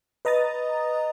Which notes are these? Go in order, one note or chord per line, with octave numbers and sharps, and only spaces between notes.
B4 D#5 A#5 D#6 A6